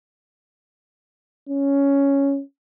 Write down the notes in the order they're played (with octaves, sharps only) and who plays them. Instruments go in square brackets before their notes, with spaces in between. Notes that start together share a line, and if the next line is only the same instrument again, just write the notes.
[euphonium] C#4